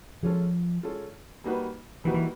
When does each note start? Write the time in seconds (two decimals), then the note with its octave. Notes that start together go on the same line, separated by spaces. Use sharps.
0.23 F3 G#3 C#4 F4 A4
0.83 G#3 C#4 F4 A4
1.44 G3 A#3 D#4 F#4 B4
2.04 E3 G3 A#3 D#4 F#4 B4
2.14 E3